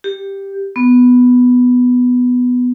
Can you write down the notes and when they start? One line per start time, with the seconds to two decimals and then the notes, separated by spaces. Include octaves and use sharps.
0.04 G4
0.76 B3